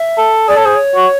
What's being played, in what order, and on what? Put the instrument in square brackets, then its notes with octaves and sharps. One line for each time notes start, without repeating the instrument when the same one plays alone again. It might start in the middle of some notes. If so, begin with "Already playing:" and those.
Already playing: [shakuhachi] E5
[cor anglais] A4
[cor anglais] G#4 [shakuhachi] D5
[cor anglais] A4 [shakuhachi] C#5
[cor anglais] G#4 [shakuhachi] C5
[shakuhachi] C#5
[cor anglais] F#4